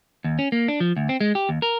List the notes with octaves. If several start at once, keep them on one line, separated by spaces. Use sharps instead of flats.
D#2
C#4
A#3
D4
F3
D2
C4
G#3
G4
D#2
A#4